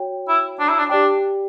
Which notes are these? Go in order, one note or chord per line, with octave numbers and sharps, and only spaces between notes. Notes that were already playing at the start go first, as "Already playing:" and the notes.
Already playing: F#4 C#5 G5
E4
D4
E4
D4
D4 G4 D5 G5